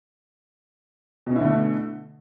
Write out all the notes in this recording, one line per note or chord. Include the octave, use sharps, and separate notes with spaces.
B2 D3 A3 C#4 E4